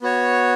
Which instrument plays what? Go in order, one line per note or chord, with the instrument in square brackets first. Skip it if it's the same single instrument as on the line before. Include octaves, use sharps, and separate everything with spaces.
[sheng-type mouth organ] B3 F#4 C#5